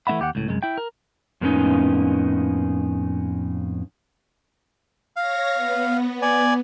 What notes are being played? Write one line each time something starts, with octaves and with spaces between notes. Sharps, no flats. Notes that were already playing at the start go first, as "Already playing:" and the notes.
E3 A3 C4 E5 F#5 B5
D#2 G4 B4 F#5
C#2 A2
C2 F#2 G#3
E4 G5
A#4
F2 A2 A#3 B3 C#4 D#4
C#5 F5 A#6
B3
D5 G#5